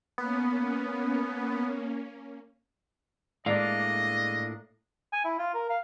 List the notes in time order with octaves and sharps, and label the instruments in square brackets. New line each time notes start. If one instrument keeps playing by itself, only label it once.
[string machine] A#3 C#4 [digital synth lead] B3
[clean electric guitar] A2 A#3 D4 [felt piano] G#3 D5 [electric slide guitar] F4 F5 [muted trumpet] D#5
[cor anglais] G#5
E4
F4
A#4
F5